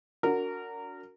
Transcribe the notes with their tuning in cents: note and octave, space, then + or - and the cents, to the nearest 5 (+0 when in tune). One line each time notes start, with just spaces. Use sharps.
D4 -40 F#4 -10 A#4 -20